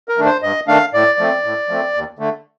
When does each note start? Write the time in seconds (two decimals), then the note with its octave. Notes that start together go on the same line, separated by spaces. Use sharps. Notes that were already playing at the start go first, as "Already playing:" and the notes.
0.09 A#4
0.18 D#3 A3 D4
0.26 C5
0.42 G2 D#5
0.68 D#3 A3 D4 F5
0.93 A2 D5
1.19 F3 A3 C4
1.44 A2
1.69 F3 A3 C4
1.94 D#2
2.19 D3 A3